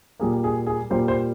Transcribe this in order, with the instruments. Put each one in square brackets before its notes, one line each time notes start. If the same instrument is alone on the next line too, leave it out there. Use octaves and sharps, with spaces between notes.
[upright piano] A#2 G3 A#3 G#4
G#4
G#4
A#2 G3 A#3 C5
C5